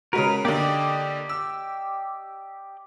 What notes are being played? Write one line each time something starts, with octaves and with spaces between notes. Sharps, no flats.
C#3 G#3 F#4 A#4 B4
D3 A#3 G4 D5 D#5
E6